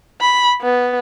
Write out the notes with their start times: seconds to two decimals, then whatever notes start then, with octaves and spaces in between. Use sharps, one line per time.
0.21 B5
0.61 B3